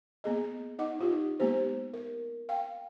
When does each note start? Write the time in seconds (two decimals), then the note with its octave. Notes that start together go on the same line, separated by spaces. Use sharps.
0.24 A#3 B3 G#4 D#5
0.79 D#4 D#5 F#5 D6
0.99 D#4 F4 G4
1.40 G#3 A#3 B3 G4 C5
1.94 A#4
2.49 F5 G5